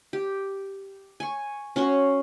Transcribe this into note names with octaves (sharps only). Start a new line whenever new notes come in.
G4
G#5 C#6
C#4 F#4 C6 C#6